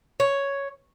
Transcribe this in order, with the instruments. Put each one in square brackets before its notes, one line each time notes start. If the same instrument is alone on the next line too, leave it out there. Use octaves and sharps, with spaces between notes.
[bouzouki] C#5